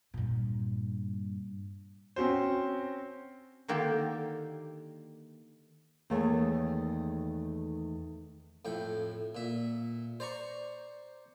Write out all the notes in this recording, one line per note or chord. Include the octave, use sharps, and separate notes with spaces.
G2 A#2
C4 C#4 F#4 C5
D3 D#3 A#3 G4 D5
E2 D#3 A3 A#3 G#4 C#5
F2 A2 G5
A#2 E5
C5 D5 A#5 C#6